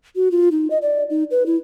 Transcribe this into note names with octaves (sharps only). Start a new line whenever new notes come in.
F#4
F4
D#4
D#5
D5
D#4
B4
E4